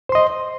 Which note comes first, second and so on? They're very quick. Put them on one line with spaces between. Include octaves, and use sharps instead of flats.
C5 C6 D#5